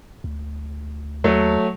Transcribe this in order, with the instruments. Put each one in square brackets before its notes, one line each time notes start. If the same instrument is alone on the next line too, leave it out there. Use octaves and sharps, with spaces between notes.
[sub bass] D2
[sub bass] D#2 [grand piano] F#3 A3